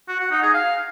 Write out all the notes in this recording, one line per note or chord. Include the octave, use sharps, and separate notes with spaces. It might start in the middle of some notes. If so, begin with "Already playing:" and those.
F#4
F#5
D#4
G#4
F5